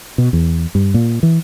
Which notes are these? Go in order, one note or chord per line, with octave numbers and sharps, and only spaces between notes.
B2
E2
G2
A#2
E3